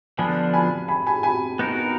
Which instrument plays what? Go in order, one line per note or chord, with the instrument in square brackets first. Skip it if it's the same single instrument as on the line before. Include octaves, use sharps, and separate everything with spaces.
[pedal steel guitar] D3 F3 B3 D4 F4 [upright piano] G#5 B5
[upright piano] G#5 B5
G#5 B5
G#5 B5
G#5 B5
[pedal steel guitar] B3 D#4 F#4 A#4